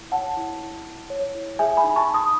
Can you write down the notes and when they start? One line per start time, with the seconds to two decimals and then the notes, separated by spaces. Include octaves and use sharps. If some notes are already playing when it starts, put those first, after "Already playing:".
Already playing: E4
0.12 C#5 F#5 A5
0.37 E4
0.61 E4
0.86 E4
1.10 C#5
1.35 E4
1.59 G#4 E5 G#5
1.77 G#5 B5
1.84 D#4
1.96 A5 C#6
2.08 D#4
2.14 B5 D#6